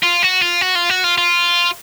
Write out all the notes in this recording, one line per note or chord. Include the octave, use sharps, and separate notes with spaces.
F4
F#4
F4
F#4
F4
F#4
F4
F4